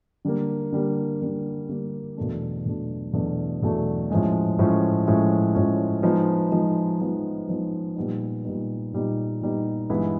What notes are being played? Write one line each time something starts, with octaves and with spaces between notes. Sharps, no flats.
D3 G3 A#3
D3 G3 A#3
D3 G3 A#3
D3 G3 A#3
E2 B2 F#3 A3 D4
E2 B2 F#3 A3 D4
E2 B2 F#3 A3 D4
E2 B2 F#3 A3 D4
A2 F3 G#3 C#4
A2 F3 G#3 C#4
A2 F3 G#3 C#4
A2 F3 G#3 C#4
F3 G#3 B3 D#4
F3 G#3 B3 D#4
F3 G#3 B3 D#4
F3 G#3 B3 D#4
A#2 G3 B3 D#4
A#2 G3 B3 D#4
A#2 G3 B3 D#4
A#2 G3 B3 D#4
G2 E3 G#3 B3 E4